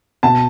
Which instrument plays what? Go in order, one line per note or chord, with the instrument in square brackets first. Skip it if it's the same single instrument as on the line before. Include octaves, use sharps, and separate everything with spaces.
[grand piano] B2 [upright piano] A5